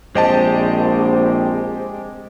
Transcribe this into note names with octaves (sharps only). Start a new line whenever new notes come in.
A#1 G#3 C4 G4 C5 D#5 A5